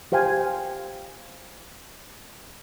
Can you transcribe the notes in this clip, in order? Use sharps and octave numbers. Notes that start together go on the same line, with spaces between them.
G4 C5 F5 G5 G#5